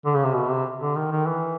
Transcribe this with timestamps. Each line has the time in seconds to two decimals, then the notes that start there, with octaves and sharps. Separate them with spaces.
0.05 D3
0.14 C#3
0.24 C3
0.34 B2
0.49 C3
0.81 D3
0.96 D#3
1.12 D#3
1.27 E3